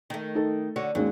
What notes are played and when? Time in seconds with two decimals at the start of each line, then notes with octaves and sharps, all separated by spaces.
0.10 D#3 A3
0.35 D#4 A4
0.76 D3 F#4 C#5
0.95 D#2 F#3 G#3 C#4